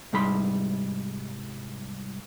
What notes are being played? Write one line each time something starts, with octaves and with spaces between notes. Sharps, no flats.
C2 G#2 G3 G#4 B5 C6